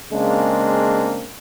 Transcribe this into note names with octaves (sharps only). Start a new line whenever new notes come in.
C#3 G#3 A#3 C4 D4